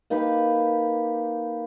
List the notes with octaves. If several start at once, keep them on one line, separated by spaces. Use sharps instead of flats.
A#3 D#4 G4 B4